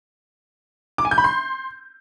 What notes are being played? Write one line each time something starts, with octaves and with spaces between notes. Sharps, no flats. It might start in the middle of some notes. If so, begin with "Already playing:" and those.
D6
G#5
G6
B5
C6